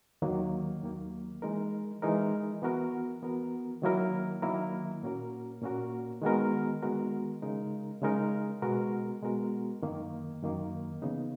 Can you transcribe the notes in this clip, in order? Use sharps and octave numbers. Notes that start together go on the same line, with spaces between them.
D#2 D#3 F#3 A#3
D#2 D#3 F#3 A#3
E3 G#3 D#4 A#4
E3 G#3 D#4 A#4
E3 B3 F#4 A#4
E3 B3 F#4 A#4
D#3 F#3 A#3 E4 A#4
D#3 F#3 A#3 E4 A#4
A#2 A#3 C#4 F#4 A#4
A#2 A#3 C#4 F#4 A#4
D#3 G#3 B3 F#4 A#4
D#3 G#3 B3 F#4 A#4
C#3 G#3 D#4 A#4
C#3 G#3 D#4 A#4
B2 G#3 B3 F#4 A#4
B2 G#3 B3 F#4 A#4
F#2 D#3 A#3
F#2 D#3 A#3
C#3 E3 B3 D#4